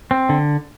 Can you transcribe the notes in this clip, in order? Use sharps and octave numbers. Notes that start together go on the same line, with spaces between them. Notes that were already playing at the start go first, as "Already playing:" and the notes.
C4
D3